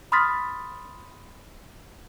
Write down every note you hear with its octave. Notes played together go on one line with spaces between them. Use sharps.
B5 C6 D#6 F6 A6 B6